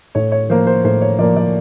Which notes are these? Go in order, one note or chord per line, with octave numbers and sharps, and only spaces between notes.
A2 C#5
C#5
F3 A#3 C5
C5
A2 C5
C#5
F3 A#3 D5
D5